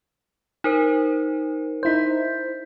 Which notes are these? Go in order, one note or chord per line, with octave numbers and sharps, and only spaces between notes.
D#4 A#4 C5
D#4 E4 C5 G6 B6